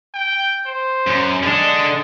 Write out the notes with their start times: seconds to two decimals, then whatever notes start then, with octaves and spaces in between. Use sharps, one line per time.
0.14 G5
0.66 C5
1.07 F#2
1.43 D3 G#3 D4